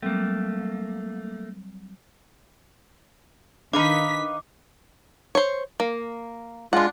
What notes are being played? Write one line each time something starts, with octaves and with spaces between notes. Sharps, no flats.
F#3 G3 A3 A#3 C4
D#3 D4 D#4 B4 F5 D6 B6
C5 C#5
A#3
G#3 D4 F4 F#5